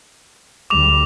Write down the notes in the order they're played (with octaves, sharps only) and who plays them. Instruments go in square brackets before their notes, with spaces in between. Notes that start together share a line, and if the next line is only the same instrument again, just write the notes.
[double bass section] D2 G3 [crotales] D6 F7